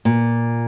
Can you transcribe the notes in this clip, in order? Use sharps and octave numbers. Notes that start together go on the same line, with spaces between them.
A#2